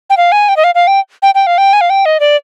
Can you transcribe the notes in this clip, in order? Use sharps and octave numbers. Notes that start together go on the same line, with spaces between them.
G5
F5
G#5
G5
D#5
F5
F5
G5
G5
G5
F5
G5
G#5
F5
G5
D#5
D5